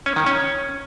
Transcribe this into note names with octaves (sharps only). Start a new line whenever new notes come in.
C#4
D#3
C#4